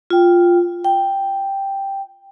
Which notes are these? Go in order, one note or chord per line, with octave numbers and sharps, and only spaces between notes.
F4 G5
G5